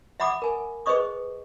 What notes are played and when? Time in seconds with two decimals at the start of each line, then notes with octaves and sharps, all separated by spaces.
0.20 E5 F#5 B5 D6 D#6
0.42 A#4 G#5
0.86 G#4 B4 C5 D#5 C#6 D#6